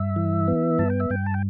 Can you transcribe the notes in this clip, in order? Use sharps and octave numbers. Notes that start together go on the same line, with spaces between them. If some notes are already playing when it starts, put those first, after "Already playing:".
Already playing: G2 E5
E3
B3
G2 A5
G5
E5
G2 G5
A5
G5